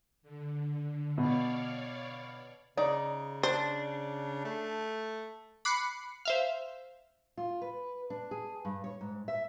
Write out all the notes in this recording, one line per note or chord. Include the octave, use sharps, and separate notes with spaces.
D3
B2 C#5 D5 F5
C#3 D#4 D5
D4 C5
A3
B5 D6 F#6 C7 C#7
C5 E5 F5
F4
B4
D4
G#4
G2
C#5
G#2
E5